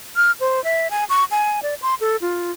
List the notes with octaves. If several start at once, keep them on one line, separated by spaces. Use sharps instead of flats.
F6
C5
E5
G#5
C#6
G#5
D5
C6
A4
F4